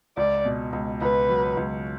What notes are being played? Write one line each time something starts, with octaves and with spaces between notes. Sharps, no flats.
C#2 D5
B2
C#2
C#2 B4
F#3
C#2